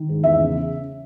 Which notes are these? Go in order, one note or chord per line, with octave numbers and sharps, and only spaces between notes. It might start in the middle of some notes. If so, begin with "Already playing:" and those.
Already playing: D#3
G#2
E2 E5
C#3